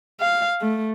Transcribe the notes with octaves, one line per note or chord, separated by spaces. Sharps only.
F5
A3